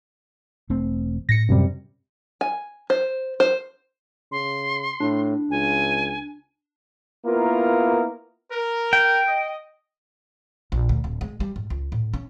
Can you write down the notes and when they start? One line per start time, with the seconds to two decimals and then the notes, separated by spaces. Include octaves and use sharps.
0.70 E1 A3 C4
1.29 A2 A#6 C#7
1.49 F#2 C3 G3
2.41 G#5
2.90 C5
3.40 C5
4.32 C#3 C6
5.00 A2 D4
5.51 C#2 G#5
7.25 A#3 B3 E4 F4 A#4
8.51 A#4
8.93 G5
9.26 D#5
10.72 A#1
10.89 D2
11.04 D1
11.21 G#3
11.40 G3
11.56 G#2
11.70 C#2
11.92 A2
12.14 C#4